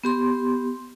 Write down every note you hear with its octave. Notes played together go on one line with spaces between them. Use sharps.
B3 G4 C6